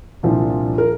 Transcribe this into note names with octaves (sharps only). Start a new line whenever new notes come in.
C2 A#2 F3 D4
A#4